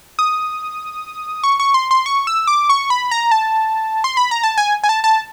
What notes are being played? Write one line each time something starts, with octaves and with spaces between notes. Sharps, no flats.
D#6
C#6
C#6
C6
C6
C#6
E6
D6
C#6
B5
A#5
A5
C6
B5
A#5
A5
G#5
G#5
A5
A5